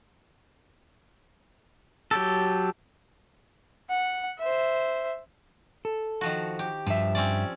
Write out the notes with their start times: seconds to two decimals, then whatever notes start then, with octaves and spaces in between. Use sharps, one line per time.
2.11 F#3 G4 A4
3.90 F#5
4.39 C5 E5
5.85 A4
6.21 D#3 F3 F#4
6.59 G4
6.86 G2 F3 E5
7.15 C4 C#4 D5